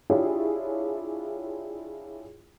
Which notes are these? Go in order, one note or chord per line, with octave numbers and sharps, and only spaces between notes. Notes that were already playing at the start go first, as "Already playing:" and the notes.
D4 E4 F4 G4 G#4 C#5